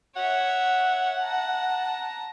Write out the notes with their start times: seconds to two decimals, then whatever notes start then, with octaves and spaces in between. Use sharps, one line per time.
0.16 C#5 E5 F#5
1.21 A5 A#5